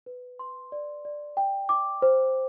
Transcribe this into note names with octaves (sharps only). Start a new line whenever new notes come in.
B4
C6
D5
D5
G5
D6
C5